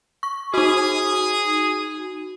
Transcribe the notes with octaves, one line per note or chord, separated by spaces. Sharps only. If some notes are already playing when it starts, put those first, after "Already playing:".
C#6
D#4 F#4 G#4 D#6